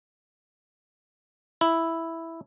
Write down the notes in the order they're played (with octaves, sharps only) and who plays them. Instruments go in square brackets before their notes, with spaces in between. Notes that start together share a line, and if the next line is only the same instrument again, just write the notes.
[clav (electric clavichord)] E4